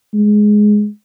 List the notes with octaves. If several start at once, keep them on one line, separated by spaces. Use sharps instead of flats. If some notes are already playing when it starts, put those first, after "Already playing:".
G#3